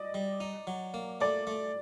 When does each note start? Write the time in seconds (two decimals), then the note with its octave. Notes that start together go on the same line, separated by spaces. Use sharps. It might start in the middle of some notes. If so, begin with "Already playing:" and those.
Already playing: D5 D#5
0.14 G3
0.40 D#4
0.67 F#3
0.94 A#3
1.21 A3 D5
1.47 A3